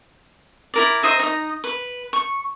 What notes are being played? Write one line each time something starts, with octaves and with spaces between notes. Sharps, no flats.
E4 A#4 D5
C5 D#5 E5 A#5
D#4 D#5
B4
C#6